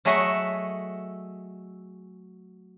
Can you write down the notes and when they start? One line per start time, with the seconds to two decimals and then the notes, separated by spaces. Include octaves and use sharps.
0.05 F#3 A3 G#4 D#5 E5 F#5